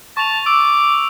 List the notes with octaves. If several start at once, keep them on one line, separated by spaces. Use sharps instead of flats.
A5 C#6 F7
D6 E6